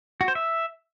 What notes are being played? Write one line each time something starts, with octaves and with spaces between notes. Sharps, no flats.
F#4
C5
E5